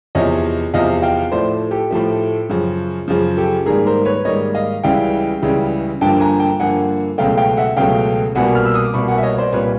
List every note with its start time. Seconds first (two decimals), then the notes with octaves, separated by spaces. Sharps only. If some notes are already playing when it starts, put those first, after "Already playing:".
0.15 E2 C3 F3 C#5 D#5
0.74 E2 C3 F3 D#5 F5
1.02 F5 G5
1.32 A2 F3 A3 C5 D5
1.71 G4 A4
1.91 A2 F3 A3
2.49 F#2 C#3 F3
3.08 F#2 C#3 F3
3.37 G4 A4
3.66 G#2 D#3 G3 A#3 G#4 A#4
3.86 A#4 C5
4.05 B4 C#5
4.25 G#2 D#3 G3 A#3 C#5 D#5
4.55 D#5 F5
4.84 C#2 C#3 E3 G3 F5 G5
5.42 C#2 C#3 E3 G3
6.01 G2 D3 F3 A#3 G5 A5
6.20 G#5 A#5
6.40 G5 A5
6.60 G2 D3 F3 A#3 F#5 G#5
7.18 C#2 B2 F#3 A3 F5 G5
7.38 F5 G5
7.57 E5 F#5
7.77 C#2 B2 F#3 A3 F5 G5
8.35 C2 B2 G3 A#3 F#5 G#5
8.55 F6
8.65 E6
8.75 D#6
8.85 D6
8.94 C2 B2 G3 A#3 B5 C#6
9.08 F#5 G#5
9.18 E5
9.23 C#5 D#5
9.38 C5 D5
9.52 C2 A#2 G3 B4 C#5